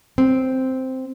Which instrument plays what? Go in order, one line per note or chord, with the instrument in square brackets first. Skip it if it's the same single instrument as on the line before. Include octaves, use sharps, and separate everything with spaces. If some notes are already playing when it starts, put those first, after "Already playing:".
[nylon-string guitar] C4